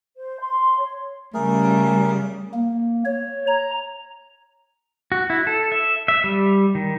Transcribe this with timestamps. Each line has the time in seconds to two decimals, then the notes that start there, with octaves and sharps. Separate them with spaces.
0.17 C5
0.40 C6
0.78 C#5
1.34 C#3 G3 A3 G#4 A#4
2.54 A#3
3.05 C#5
3.47 A#5
5.12 F#4
5.30 E4
5.47 A4
5.72 E5
6.08 E5
6.24 G3
6.75 D#3